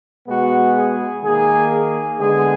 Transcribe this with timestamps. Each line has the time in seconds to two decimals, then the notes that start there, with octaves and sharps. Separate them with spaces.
0.28 B2 G#3 B3 F#4
0.76 G#4
1.23 D#3 A#3 G#4
1.72 G#4
2.19 D3 G#3 B3 G#4